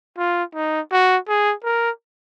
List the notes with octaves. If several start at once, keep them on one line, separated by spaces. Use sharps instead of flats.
F4
D#4
F#4
G#4
A#4